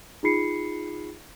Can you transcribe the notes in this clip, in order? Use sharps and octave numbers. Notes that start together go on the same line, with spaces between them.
D#4 F4 G#4 B5 C7 C#7